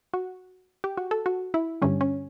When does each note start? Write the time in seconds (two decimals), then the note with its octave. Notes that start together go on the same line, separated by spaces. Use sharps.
0.14 F#4
0.84 G4
0.98 F#4
1.11 A4
1.26 F#4
1.54 E4
1.82 G2 D3 G3 C#4
2.01 C#4